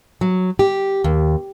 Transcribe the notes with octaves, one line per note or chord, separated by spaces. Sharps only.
F#3
G4
D#2